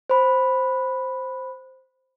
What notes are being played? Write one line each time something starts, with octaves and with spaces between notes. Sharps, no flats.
C5 B5